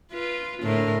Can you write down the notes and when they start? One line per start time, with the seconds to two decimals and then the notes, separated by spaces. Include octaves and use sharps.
0.12 F4 B4
0.62 A2 D3 A#4